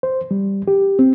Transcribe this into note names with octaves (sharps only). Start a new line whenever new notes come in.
C5
G3
G4
C4